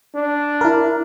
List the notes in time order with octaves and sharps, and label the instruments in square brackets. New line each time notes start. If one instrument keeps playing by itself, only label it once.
[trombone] D4
[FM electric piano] E4 A#4